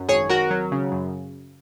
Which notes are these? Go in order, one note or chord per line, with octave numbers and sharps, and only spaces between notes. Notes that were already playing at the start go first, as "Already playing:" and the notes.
Already playing: F#2
G#1 G#4 C#5
G#1 F#4 A#4
F#3
C#3
F#2